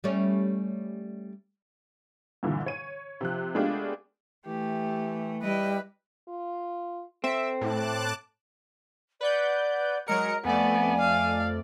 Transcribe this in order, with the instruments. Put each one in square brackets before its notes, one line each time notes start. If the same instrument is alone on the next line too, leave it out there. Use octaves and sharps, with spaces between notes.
[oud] G3 A3 C#4
[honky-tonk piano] G2 A#2 D3 E3
C#5 D#7
C3 F3 F#6
G#3 A3 B3 D4 F4 G4
[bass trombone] E3 [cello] A3 [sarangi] G4
[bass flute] G3 [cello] E4 D#5 [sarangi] B4
[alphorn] F4
[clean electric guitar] C4 [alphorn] A4 [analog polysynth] E5
[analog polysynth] A2 [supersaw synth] A5 D6 F#6
[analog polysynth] B4 F#5 G6 [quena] D5
[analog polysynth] F#3 G#3 C#7 [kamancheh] A#4 [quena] D#5
[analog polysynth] F2 A3 D5 [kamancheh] B3 [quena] G#5
[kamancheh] F5